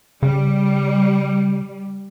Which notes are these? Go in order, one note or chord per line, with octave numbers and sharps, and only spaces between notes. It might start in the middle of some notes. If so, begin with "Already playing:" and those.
C#3 G3